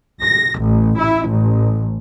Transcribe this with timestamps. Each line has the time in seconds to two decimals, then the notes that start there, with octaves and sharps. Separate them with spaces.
0.21 A#6
0.62 A1
0.99 E4
1.31 A1